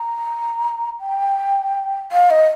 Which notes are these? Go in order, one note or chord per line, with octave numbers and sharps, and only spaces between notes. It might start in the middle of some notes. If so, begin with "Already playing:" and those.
Already playing: A#5
G5
F5
D#5